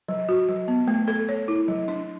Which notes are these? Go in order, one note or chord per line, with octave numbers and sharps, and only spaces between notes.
F#3
F#4
F#3
B3
A3
A4
C#5
E4
F#3
D4